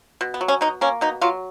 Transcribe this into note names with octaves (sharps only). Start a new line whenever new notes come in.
B2
B3
F#3
C#4
B2 D#4
A#3 C#4
B2 D#4
F#3 F4